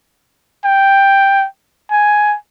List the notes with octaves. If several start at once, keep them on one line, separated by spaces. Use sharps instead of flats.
G5
G#5